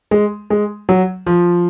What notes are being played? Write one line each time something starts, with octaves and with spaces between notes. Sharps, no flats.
G#3
G#3
F#3
F3